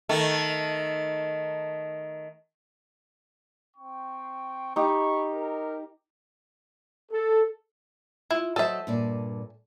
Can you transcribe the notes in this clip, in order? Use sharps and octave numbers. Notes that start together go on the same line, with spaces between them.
D#3 A3
C4 G5 C#6
D#4 G4 G5 B5 C#6
A#4
A4
E4 F4
F#3 A4 C5 D#5 E5
G2 A#2 D5